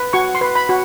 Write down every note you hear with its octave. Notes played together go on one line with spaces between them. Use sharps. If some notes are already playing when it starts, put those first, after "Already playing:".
Already playing: B4
F#4 C#6
C6
B4
B5
F#4